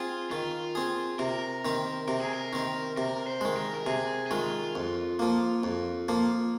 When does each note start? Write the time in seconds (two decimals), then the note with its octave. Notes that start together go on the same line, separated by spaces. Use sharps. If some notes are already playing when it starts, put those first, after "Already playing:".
Already playing: C4 F4 G#4
0.31 D#3 F4
0.75 C4 G#4
1.19 C3 A#4
1.65 D#3 C4
2.08 C3 A#4
2.21 G#4
2.33 A#4
2.53 D#3 C4
2.97 C3 A#4
3.27 C5
3.41 D#3 G#3
3.56 A#4
3.74 A#4
3.86 C3 G#4
4.27 G#4
4.30 D#3 G#3 F4
4.75 F2
5.19 F3 A#3
5.63 F2
6.08 F3 A#3